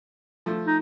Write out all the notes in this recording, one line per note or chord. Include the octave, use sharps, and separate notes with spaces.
F3 A3
D#4